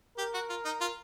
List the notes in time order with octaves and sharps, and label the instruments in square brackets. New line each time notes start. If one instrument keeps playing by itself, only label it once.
[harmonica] G4 [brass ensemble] A#4
[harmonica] F#4
F4
D#4
F4